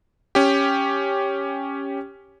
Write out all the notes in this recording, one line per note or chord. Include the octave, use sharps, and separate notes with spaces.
C#4 G4